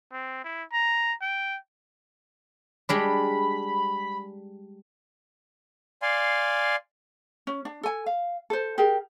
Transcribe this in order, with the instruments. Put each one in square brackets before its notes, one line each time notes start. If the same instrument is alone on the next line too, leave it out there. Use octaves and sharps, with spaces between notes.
[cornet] C4
E4
A#5
G5
[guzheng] G3 G#3 D4 [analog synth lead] B5
[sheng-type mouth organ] D5 F5 G#5 C6
[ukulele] C#4
D4
A4 G#5
F5
A4 C5
G4 G#4 A#4